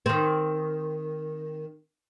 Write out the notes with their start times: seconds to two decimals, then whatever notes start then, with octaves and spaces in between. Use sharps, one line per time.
0.06 D#3 C4